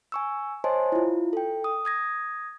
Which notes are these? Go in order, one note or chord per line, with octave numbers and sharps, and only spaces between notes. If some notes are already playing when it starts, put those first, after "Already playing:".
G#5 C#6 E6
C5 C#5 D#5 G#5 A5 C6
E4 F4
A4 G5
D#6
D#6 G#6 A#6